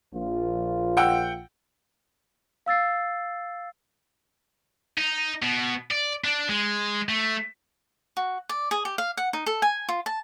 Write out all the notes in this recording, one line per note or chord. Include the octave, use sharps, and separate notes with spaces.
A#1 F4
F#5 G5 E6
F5 E6 A6 C7
D#4
B2
D5
D4
G#3
A3
F#4
D5
G#4
G4
F5
F#5
D#4
A4
G#5
F4
A5